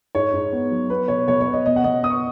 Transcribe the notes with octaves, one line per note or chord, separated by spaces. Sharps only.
G#2 C#5
G#2
B3
F#3
B3 B4
B2 C#5
B2 C#5
C#5
B3
D#5
B2 D#5
F#5
B2 D#5
B3 D#6
C#6